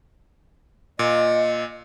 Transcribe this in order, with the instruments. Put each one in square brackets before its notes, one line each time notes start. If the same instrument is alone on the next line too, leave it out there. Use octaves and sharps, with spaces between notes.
[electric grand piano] A#2 [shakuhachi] D#5